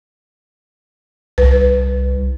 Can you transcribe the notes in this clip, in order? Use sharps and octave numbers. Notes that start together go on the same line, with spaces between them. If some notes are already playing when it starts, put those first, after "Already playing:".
C2 B4